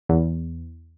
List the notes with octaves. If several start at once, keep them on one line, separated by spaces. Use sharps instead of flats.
E2